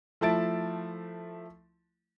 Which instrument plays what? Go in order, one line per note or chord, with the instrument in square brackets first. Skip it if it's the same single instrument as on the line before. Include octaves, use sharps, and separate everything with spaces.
[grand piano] F3 A3 E4 A5 A6 D7